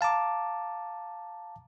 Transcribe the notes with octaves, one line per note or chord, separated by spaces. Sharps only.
F5 A5 A#5 D6